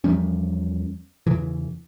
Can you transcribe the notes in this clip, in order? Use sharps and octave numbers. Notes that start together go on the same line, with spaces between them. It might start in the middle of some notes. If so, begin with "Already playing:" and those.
E2 F3 G3 C#4
E2 C#3 E3